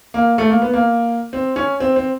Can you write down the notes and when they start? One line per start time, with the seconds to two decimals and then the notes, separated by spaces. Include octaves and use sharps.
0.14 A#3
0.38 A3
0.50 A#3
0.62 B3
0.74 A#3
1.33 C4
1.56 C#4
1.80 C4
1.96 C4